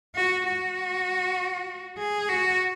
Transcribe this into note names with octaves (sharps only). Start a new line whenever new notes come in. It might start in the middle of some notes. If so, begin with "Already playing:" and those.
F#4
F#4
G#4
F#4